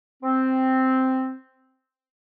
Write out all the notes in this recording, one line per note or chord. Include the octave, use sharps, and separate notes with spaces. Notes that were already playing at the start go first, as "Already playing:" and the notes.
C4